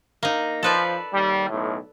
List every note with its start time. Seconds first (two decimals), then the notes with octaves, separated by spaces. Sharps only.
0.23 A#3 D#4
0.63 F3 A4 B4 D5
1.14 D#2 G3
1.50 B1 A2